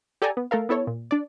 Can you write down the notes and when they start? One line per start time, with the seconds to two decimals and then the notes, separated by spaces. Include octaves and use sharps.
0.22 G4 A4 D5 G#5 A#5
0.37 B3
0.51 A3 A4 A#4 F5
0.69 B3 E4 A4 C#5
0.87 A#2
1.11 D4 D5